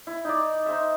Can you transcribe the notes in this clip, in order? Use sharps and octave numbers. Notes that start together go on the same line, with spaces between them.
E4
D#4 D5
D#4 C5 E5